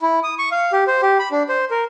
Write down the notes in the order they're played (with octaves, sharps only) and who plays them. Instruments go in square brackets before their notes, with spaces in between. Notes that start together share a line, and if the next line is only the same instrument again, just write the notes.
[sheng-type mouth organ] E4
D#6
C#6
F5
G4
C5
G4
B5
D4
C5
A#4